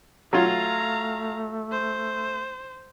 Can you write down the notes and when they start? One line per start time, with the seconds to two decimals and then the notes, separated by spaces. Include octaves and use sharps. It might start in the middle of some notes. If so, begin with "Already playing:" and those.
0.33 F#3 A3 F4 F5 A#5
1.72 C5